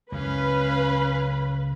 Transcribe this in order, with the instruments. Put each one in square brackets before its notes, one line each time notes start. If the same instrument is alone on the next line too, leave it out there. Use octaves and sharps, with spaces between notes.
[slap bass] C#2 F#2 [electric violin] C#4 F5 [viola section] B4 B5